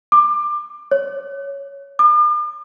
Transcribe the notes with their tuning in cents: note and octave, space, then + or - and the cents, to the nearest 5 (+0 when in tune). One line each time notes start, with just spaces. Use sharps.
D6 +25
C#5 +5
D6 +45